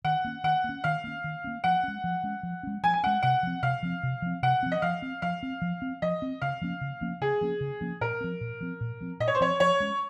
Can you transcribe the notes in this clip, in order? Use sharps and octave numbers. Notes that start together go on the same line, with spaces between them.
D#3 F#5
A#3 C#4
D#3 F#5
A#3 C#4
D#3 F5
A#3 C#4
D#3
A#3 C#4
F3 F#5
G#3 C#4
F3
G#3 C#4
F3
G#3 C#4
F3 G#5
G#5
G#3 C#4 F#5
C3 F#5
F3 C4
C3 F5
F3 C4
C3
F3 C4
C3 F#5
F3 C4
D#5
F3 F5
C4
F3 F5
C4
F3
C4
F3 D#5
C4
C#3 F5
F3 A#3 C#4
C#3
F3 A#3 C#4
C#3 G#4
F3 A#3 C#4
C#3
F3 A#3 C#4
A#2 A#4
F3 C4
A#2
F3 C4
A#2
F3 C4
A#2 D#5
C#5
C5
F3 C4 C#5
F3 C#5
G#3 C#4